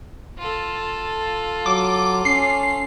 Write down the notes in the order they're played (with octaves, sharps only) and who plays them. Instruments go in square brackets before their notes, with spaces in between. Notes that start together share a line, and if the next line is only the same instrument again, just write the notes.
[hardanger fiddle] F4 A4
[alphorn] F#3 [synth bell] D6
[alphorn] C#4 [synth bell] C7